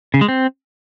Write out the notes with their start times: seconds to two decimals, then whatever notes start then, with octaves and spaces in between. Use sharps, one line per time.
0.14 C#3
0.21 G#3
0.28 C4